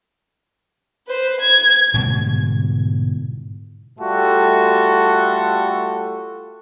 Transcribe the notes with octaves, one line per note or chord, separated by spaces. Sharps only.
B4 C5
G#6
G#2 B2 D3 G3
G3 A3 F4 F#4 A4